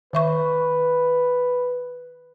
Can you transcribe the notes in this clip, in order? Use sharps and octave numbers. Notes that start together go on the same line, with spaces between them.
D#3 B4 E5 C#6